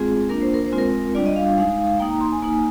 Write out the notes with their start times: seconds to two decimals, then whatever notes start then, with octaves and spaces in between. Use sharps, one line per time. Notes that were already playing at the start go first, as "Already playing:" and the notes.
Already playing: G#3 C4 F4 G#4
0.29 A#3 D4 F4 A#4
0.42 C5
0.54 A#4
0.66 C5
0.72 G#3 C4 F4
0.78 A#4
1.15 G3 D4 F4 D5
1.26 D#5
1.36 F5
1.46 F5
1.58 G#3 D#4 F5
2.00 A#3 D#4 G5
2.10 A#5
2.21 C6
2.32 G#5
2.42 A#3 D#4